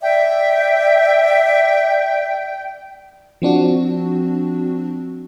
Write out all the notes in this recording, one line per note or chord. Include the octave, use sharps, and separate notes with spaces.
D5 E5 G5
F3 C4 D4 F#4